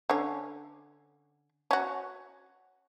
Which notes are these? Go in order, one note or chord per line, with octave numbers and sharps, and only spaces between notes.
D3 C#4
C#4 F#4